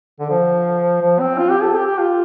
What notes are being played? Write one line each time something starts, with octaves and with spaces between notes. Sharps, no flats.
D3
F3
F3
C4
F4
G4
A4
G4
G4
F4